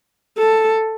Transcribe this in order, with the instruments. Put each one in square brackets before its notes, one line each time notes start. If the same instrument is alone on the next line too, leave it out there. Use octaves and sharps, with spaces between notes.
[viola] A4